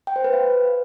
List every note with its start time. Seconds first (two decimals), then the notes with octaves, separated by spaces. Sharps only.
0.07 G5
0.16 C5
0.24 B4
0.33 F5